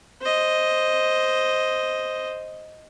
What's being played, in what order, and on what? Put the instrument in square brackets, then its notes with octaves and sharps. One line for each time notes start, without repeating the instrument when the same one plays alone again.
[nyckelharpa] C5 D#5